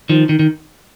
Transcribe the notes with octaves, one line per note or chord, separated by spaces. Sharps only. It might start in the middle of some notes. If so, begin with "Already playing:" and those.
D#3 F3
D#3
D#3